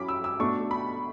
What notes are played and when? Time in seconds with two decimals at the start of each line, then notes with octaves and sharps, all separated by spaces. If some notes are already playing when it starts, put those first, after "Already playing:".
Already playing: F#3 C#4 E4 B5 D6
0.09 E6
0.24 E6
0.40 B2 A3 D4 C#6
0.71 B5